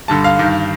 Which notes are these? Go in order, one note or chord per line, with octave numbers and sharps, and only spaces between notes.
G2 D3 A5
F5
G2 D#3